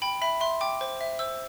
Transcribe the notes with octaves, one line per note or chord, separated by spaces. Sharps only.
G5 B5
E5 B5
E5 C6
G5 D6
C5
E5
C5 E6